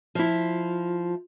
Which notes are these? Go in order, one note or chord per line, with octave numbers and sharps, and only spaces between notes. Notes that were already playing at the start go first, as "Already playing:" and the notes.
F3 E4